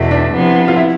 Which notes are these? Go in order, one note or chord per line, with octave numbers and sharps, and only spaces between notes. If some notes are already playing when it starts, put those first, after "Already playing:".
Already playing: E2 B2 A3
D4
C3 F3 B3 E4
F4
E4